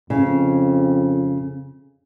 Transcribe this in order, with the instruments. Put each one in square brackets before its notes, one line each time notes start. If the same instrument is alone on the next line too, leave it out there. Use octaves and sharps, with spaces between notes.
[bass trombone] F2 [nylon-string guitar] C#3